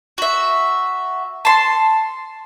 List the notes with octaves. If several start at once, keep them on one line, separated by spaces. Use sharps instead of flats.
F#4 E5
A5 C6